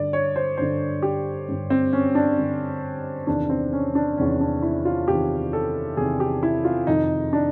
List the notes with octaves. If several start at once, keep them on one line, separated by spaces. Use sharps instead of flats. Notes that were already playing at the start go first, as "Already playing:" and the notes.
Already playing: G2 D3 D5
C#5
C5
G2 D3 C5
G4
G2 D3
C4
C#4
D4
G2 D3
E2 C3 D#3 D4
C4
C#4
D4
E2 C3 D#3 C#4
D4
E4
F4
E2 C3 D#3 G4
A4
E2 C3 D#3 G#4
G4
E4
F4
F2 C3 D#3 D#4
D4